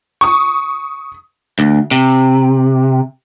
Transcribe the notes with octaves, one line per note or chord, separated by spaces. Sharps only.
C#6 D#6
D2
C3